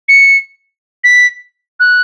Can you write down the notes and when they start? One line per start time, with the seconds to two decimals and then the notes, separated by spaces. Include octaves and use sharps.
0.08 C#7
1.03 B6
1.79 F#6